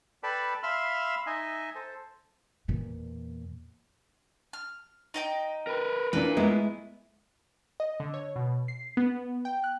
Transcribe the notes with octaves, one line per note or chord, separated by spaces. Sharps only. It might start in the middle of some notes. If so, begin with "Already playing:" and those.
A4 B4 D5 G5 A5 B5
E5 F5 B5 C6 E6 F6
D#4 D#5 E5 G#5
A4 C5
E2 A#2
F6
D#4 D#5 G5
A#4 B4
E3 D4 F4 A#4 B4
G#3 A3 B3 E4
D#5
D3
C#5
B2
C7
B3
G5
F#6